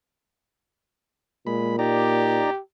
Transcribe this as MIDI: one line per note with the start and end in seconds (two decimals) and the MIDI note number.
1.47 2.47 46
1.47 1.76 56
1.47 1.76 83
1.79 2.50 63
1.79 2.59 67
1.79 2.50 74
1.79 2.50 82